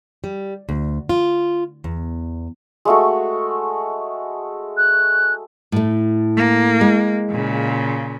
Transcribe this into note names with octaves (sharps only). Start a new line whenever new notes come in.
G3
D2
F4
E2
G#3 A3 F#4
F#6
A2 A3
A#3
G#3
A#2 C#3